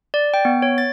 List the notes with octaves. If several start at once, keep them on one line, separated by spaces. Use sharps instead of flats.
D5
G5
B3
C#5
A6